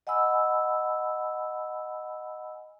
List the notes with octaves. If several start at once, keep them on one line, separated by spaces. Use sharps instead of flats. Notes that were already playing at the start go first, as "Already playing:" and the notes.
D#5 F#5 G#5 B5 E6